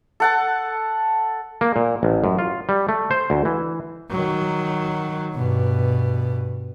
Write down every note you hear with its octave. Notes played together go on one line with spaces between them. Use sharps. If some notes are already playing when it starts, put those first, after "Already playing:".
A4 F#5 A5
A#3
A#2
A1
F#2
F4
G3
A3
C5
D2
E3
D#3 F#3
G2 B2